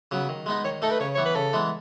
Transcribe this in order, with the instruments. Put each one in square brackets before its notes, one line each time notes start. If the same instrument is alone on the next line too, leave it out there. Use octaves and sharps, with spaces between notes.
[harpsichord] C#3 F#3 B3
D#3
G#3 B3 D#4
[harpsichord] D#3 [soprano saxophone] C#5
[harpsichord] A3 D#4 [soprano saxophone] A4
[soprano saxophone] B4
[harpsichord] C#3 [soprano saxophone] C#5
[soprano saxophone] C#5
[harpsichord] E3 B3
[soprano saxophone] B4
[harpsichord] C#3 [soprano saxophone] A4
[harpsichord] E3 G#3 B3